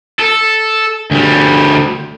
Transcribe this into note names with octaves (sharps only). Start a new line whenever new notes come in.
A4
D2 G3